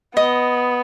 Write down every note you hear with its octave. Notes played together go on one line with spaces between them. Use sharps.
B3 D#5